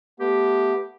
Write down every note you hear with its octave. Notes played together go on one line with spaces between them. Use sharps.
A3 B3 G4